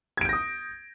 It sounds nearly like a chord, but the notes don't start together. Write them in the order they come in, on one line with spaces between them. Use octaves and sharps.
G#6 D7 G6 A#6 D#6